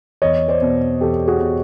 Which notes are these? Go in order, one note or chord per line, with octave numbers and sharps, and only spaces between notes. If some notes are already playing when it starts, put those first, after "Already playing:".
E2 C#5 D#5
C5 D5
B2
E2 G4 A4
F#4 G#4
B2
G4